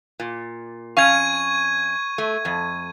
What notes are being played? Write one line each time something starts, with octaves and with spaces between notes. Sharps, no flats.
A#2
F2 C#4 F5 C#6 G#6 D#7
A3
F2